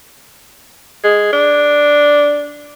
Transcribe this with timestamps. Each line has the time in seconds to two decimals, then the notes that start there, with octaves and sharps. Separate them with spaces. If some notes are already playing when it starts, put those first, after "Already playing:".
1.04 G#3
1.33 D4